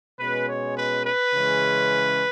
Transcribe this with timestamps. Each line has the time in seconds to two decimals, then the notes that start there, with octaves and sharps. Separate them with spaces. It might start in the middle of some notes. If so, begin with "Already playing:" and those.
0.19 B2 G#3 C#4 B4
0.47 C#5
0.76 B4
1.04 B4
1.33 C#3 E3 G#3 C#4